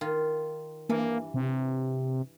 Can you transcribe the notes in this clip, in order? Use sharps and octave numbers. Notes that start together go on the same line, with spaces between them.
D#3 F4
G2 E3 A#3
C3